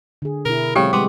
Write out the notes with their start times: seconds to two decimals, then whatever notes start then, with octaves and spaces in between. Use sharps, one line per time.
0.22 D3 G#4
0.45 B2 E4 A#4
0.76 C#3 F#3 G#3 C4 G4 A4 G5
0.93 G3 G#3 B3 C6 D6